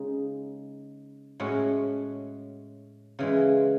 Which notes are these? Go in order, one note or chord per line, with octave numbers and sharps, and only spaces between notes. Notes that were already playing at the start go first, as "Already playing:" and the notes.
Already playing: C#3 G#3 D#4
A2 G#3 C#4 F#4
C#3 E3 G#3